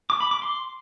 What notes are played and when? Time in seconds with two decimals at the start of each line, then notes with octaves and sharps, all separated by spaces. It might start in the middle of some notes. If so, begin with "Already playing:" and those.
0.10 D6
0.20 B5
0.31 D6
0.42 C6